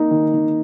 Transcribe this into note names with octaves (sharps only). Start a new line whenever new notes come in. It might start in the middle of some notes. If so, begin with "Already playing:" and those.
Already playing: A#3 D#4
D#3
D#3